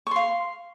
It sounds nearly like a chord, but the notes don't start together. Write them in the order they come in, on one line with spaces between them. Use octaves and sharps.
C#6 C6 F5